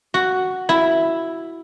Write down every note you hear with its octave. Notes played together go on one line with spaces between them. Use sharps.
F#4
E4